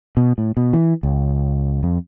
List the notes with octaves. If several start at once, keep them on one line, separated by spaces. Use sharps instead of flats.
B2
A2
B2
E3
C#2
F2